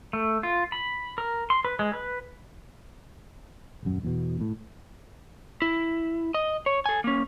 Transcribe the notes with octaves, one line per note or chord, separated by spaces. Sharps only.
A3
F4
B5
A#4
C6
B4
G#3
B4
D#1 F#2
E2 B2
A2
E4
D#5
C#5
A4 G#5
A#3 C#4